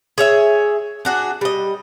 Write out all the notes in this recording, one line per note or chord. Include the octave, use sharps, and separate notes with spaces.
G#4 C#5 E5
D4 F#4 G#4
G3 D#5